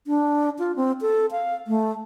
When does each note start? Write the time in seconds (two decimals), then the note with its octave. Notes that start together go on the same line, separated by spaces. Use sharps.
0.07 D4
0.59 F4
0.76 C4
1.01 A4
1.31 F5
1.67 A3